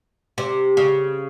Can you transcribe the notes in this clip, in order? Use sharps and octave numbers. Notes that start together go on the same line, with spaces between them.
C3
C#3